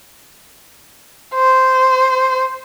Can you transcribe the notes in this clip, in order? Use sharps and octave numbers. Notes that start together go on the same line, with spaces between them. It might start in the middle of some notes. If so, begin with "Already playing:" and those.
C5